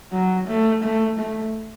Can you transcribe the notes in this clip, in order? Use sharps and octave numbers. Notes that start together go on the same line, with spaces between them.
F#3
A3
A3
A3